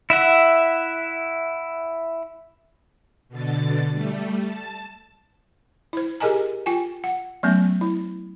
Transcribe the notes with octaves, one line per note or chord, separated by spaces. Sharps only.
E4 E5 F#5
B2 D3 A6
G3 A3
A5
E4 C5
G4 G#4 A#4 D#5 G#5 A#5
F4 G5 G#5
F#5
F#3 A3 B3 C#4
E4